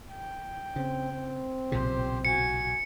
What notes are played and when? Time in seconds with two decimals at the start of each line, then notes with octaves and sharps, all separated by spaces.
0.11 G5
0.76 C#3 C4
1.12 C4
1.72 B1 A#2 C#3 G4 C5
2.25 F#4 G#5 C#7